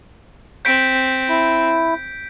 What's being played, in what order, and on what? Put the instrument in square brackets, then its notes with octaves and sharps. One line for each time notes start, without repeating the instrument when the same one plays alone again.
[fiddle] C4 [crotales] G6 B6 D7
[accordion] E4